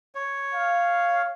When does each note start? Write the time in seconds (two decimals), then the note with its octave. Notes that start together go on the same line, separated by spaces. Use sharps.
0.15 C#5
0.54 F5